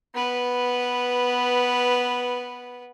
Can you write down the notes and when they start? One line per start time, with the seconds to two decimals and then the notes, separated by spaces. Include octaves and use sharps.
0.14 B3 B4